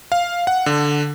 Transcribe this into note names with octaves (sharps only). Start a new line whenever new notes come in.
F5
F#5
D3